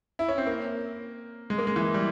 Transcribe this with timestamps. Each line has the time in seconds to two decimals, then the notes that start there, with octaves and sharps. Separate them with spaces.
0.19 E4
0.28 C#4
0.38 C4
0.47 A#3
1.50 G#3
1.58 A#3
1.67 G#3
1.76 E3
1.94 G3